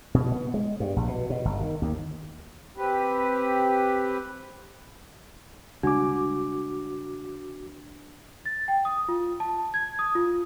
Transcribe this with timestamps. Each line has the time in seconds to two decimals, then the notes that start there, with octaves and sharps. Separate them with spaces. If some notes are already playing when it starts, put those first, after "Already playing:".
0.14 B2
0.32 B3
0.54 G#3
0.80 G2
0.96 A#1
1.08 B2
1.30 B2
1.45 G1
1.61 D#3
1.82 D#2
2.77 C4 G4 B4
5.83 C#3 G3 G#3 D4 F#4 D6
8.46 A6
8.68 G5
8.85 D#6
9.08 F4
9.40 A5
9.74 G#6
9.99 D#6
10.15 F4